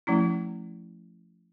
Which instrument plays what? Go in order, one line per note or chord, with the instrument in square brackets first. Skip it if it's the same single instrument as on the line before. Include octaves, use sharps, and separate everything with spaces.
[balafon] F3 A3 C#4 E4